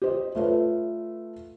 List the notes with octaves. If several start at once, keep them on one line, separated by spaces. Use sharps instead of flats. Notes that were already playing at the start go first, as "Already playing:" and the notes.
G4 C5 D#5
A3 F4 A4 B4 C#5